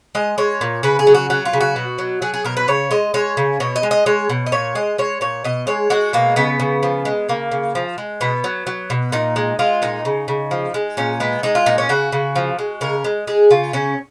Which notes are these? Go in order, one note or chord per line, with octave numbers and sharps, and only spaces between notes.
G#3 D#5
G#3 C#5
A#2
C#3 B4
G#4
F#3
F#4
F#3 F#4
F4
C#3
F#4
B2
F#3
F#3 G#4
G#4
B2 A#4
B4
C#3 C#5
G#3 D#5
G#3 C#5
C#3
B2 C#5
D#5
G#3
D#5
G#3 C#5
B2
D#5
A#2 C#5
G#3 D#5
G#3 C#5
A#2 C#5
B2 D#5
G#3 C#5
G#3 F#4
B2 A#3
C#3 B3
C#3
F3
G#3
C#3 A#3
C#3
F3
G#3
B2 B3
F#3
F#3
B2
A#2 D#4
G#3
G#3 F4
A#2 D#4
C#3
C#3
F3
G#3
A#2 C#4
G#3 B3
G#3 D#4
F4
A#2 D#4
C#4
C#3 F#4
C#3
F3
G#3
C#3 A#4
G#3
G#3 G#4
C#3 F4
C#3 C#4